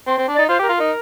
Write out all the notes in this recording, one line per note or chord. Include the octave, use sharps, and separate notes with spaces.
C4 C6
C4
D4
D#4 D5
F4 C5
G4 A#4
F4
D#4 A#4